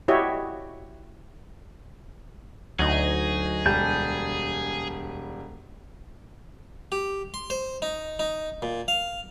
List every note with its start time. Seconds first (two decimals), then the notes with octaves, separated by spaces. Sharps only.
0.08 E4 F#4 G4 C#5 D#5 E5
2.79 D2 F#3 D#4 G#4
3.66 E1 G3 G4 G#5 A5 G6
6.92 G4
7.34 C6
7.50 C5
7.82 D#4
8.19 D#4
8.62 A#2
8.88 F5